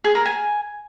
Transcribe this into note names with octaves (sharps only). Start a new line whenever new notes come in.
G#4
A#4
G#5